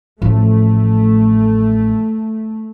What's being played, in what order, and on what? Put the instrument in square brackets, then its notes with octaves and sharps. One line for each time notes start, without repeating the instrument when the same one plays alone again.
[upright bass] A1 F3 [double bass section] A3